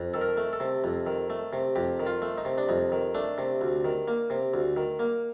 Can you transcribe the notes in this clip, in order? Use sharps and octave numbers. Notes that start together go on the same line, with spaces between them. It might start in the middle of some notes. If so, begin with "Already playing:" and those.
Already playing: F2
D#3 A4
A#4
A3
A4
C3
F2
D#3
A3
C3
F2 G4
D#3
F4
A3
D#4
C3
D4
F2 D#4
D#3
A3 D4
C3
D2
D#3
A#3
C3
D2
D#3
A#3